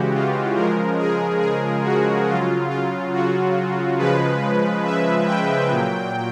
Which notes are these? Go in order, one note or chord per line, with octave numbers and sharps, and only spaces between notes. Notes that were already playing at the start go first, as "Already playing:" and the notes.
Already playing: C#3 E3 G#3 F#4 G4
F4
C#3 F3 G#3 A#4
G#4
G#4
F#4
C#3 F#3 F4
F4
F#4
C#3 F3 G#3 B4
E5
G5
A#2 F#3